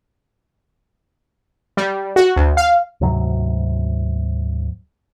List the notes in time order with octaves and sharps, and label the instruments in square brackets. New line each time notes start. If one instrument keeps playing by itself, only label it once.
[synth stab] G3
F#4
D2
F5
[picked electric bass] D2 G#2 C3 F#3